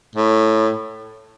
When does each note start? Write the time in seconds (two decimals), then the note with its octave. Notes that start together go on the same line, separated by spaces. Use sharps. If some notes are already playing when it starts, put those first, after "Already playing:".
0.15 A2